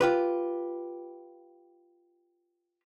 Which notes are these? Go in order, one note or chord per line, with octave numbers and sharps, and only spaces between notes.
F4 G4 B4